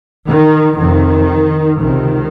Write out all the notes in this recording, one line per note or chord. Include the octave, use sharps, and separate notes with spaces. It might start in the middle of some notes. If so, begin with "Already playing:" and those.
D#3
F2 C3 D#3
C#2 C3 D#3